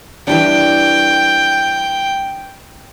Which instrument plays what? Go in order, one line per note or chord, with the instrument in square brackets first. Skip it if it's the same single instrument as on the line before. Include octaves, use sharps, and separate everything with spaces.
[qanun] E3 G3 D4 [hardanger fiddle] G5